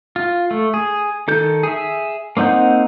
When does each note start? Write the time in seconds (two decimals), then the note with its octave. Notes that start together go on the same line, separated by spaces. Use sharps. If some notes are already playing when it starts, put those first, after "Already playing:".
0.16 F4
0.51 A3
0.74 G#4
1.28 D#3 A4 G6
1.63 G#4 E5
2.37 A#3 C4 D#4 F#5 G6